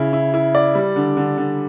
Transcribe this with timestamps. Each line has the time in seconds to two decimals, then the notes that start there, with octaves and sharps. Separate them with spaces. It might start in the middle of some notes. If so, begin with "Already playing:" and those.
Already playing: C#3 E4
0.13 E4
0.34 E4
0.55 D5
0.75 G3
0.96 D3
1.17 D3
1.37 D3